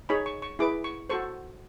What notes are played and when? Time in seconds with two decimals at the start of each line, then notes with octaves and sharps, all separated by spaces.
0.09 D#4 G#4 C#5 B5
0.26 C#6
0.42 C#6
0.59 E4 G#4 B4 D6
0.84 C#6
1.10 F#4 A4 C5 C#6